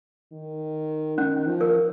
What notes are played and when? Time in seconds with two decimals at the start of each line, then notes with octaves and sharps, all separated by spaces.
0.33 D#3
1.18 D#3 C#4
1.47 F3
1.61 A#4